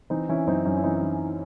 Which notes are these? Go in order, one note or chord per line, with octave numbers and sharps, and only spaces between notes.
E3 C4 D#4
E3 C#4 E4
F#2 C4 D#4
F#2 C#4
E4
E3 C4 D#4
E3